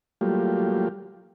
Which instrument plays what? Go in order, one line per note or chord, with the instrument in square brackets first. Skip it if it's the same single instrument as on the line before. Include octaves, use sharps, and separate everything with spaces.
[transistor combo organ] F#3 G3 A3 A#3 F4 G4